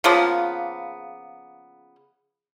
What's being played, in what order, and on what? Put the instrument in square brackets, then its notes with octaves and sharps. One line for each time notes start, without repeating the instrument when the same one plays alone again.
[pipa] C#3 F3 A#3 B3